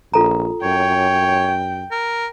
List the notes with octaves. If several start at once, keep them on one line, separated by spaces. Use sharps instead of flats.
A#1 F4 A4 A#5
F#2 C#5 G5
A#4